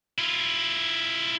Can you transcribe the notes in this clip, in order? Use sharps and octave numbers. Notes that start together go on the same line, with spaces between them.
E4 F4